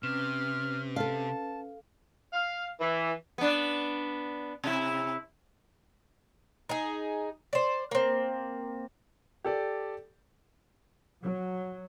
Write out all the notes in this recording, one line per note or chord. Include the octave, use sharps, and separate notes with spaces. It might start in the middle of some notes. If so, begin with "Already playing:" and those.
C3 C#4 B4 F6
A4 F5 A5
F5
E3
B3 D4
C3 E4
D#4 G#4
C5 D5
A#3 C4
G4 A4 D5
F#3